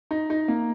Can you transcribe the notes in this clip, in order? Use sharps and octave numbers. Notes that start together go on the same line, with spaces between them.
D#4
D#4
A#3